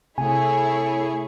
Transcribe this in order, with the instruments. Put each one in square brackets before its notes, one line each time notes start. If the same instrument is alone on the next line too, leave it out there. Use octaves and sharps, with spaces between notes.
[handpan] C3 [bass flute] A3 [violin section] E4 G#4 C#5 [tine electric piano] G#5